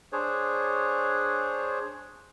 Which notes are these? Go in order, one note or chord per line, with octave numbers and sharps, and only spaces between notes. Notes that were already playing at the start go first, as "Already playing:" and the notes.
D4 G#4 C5 C#5